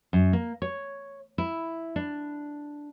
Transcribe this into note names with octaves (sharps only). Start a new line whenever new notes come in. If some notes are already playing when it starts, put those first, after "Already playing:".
F#2
A#3
C#5
E4
D4